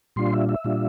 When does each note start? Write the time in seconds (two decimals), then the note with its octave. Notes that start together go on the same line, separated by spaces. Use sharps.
0.16 A#2 G3 D4 F4 C6
0.33 E5
0.49 E5
0.64 A#2 G3 D4 F4